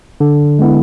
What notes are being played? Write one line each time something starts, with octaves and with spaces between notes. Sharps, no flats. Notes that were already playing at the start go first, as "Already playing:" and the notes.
D3
G#3 B3 E4